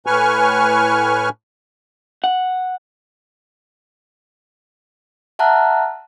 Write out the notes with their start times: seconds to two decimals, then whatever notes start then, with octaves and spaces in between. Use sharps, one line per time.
0.07 A2 B4 G#5 C#6 F6
2.24 F#5
5.39 E5 F#5 A5 A#5 F6 F#6